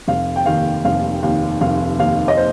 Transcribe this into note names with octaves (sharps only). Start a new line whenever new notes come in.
F1 F5
G5
D#2 D#3 F5
F1 F5
D#2 D#3 F5
F1 F5
D#2 D#3 F5
D#5
C5